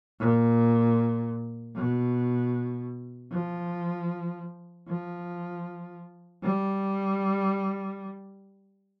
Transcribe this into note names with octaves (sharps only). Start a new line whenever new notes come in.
A#2
B2
F3
F3
G3